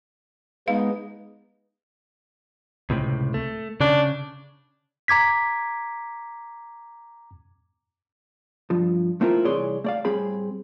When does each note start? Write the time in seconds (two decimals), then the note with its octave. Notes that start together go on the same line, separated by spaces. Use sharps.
0.68 G#3 B3 D#4 F5
2.90 C#2 A2 C3
3.34 A3
3.81 C#3 D4
5.08 A#5 D6 G#6 B6
8.70 G2 F3
9.21 A3 C4 E4 F4 A#4
9.45 C2 E3 G#4 C#5 D5 C6
9.84 A3 D5 F5
10.05 A2 G3 C4 G#4 B5